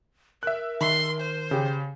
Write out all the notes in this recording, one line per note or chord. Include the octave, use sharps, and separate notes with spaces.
A#4 E5 F#6
D#3 C6
C5
C#3 G4